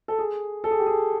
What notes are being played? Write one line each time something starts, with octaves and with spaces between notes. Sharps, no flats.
A4
G#4
A4
G#4
G4
G#4